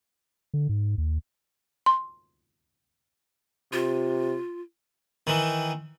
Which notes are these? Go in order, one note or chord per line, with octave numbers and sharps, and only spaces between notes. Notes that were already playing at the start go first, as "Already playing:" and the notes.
D3
G#2
D#2
C6
C3 F4
D#3 E3